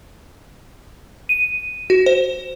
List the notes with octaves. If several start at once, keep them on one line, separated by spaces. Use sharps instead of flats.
D#7
F#4
C5